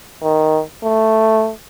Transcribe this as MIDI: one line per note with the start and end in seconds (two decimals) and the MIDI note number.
0.22 0.61 51
0.84 1.51 57